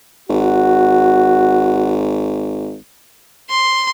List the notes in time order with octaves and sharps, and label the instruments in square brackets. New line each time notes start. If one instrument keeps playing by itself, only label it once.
[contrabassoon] G#1 [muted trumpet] F#4
[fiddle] C6